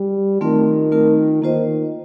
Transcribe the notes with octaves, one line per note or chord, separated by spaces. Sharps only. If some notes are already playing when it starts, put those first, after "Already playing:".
Already playing: G3
D#3 A3 C4 F4 A#4
A3 C4 F4 A#4
D#3 A#3 F4 C5 D#5